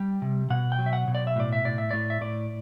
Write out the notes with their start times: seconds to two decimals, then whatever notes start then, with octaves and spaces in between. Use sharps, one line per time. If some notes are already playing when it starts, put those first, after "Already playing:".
Already playing: G3 G5
0.22 C3
0.50 B2 F#5
0.72 G5
0.79 F#3
0.86 E5
0.93 F#5
1.08 B2
1.15 D5
1.27 E5
1.36 A2 D5
1.53 E5
1.65 A2 D5
1.78 E5
1.91 A2 D5
2.10 E5
2.21 A2 D5